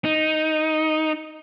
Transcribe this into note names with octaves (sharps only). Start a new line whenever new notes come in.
D#4